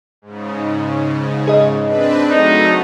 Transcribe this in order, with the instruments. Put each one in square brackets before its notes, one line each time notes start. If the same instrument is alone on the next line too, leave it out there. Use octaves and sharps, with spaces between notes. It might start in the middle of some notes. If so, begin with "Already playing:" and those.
[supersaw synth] G#2 C#3
[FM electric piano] G#4 D#5
[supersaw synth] C4 D4 B4
[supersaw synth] F#3 A3 [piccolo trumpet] D#4